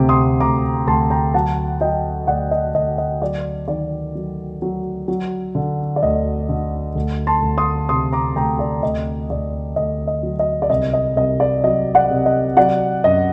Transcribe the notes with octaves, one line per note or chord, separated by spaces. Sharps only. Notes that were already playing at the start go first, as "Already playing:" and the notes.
Already playing: D2 C3 D6
C6 D#6
D2 A#5 D6
D2 A5 C6
G5 A#5
F#3 F#5 A5
F#3 D#5 G5
D2 D5 F#5
D#5
D2 D#5
D#5
F#3 D5
D#3 D5
F#3
F#3
F#3
D3
D5
D2 D#5
D3
D2
A5 C6
D2
C6 D#6
C3 C6 D#6
A#5 D6
D2 G5 A#5
D5
D2 D#5
D2 D5
D2 D#5
D#5
F#3
D#5
D5
C2 D#5
D#5
C2 D#5
D5
F#3 D#5
D5 F#5
C3
D#5
F#3 D5 F#5
F#2 D#5